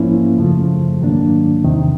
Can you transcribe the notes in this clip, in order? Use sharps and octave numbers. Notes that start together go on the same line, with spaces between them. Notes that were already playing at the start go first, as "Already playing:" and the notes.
Already playing: G#2 F3 A#3 C#4 E4
F#2 C#3 F3 A3
G#2 D#3 F#3 A#3 D4
E2 C3 D#3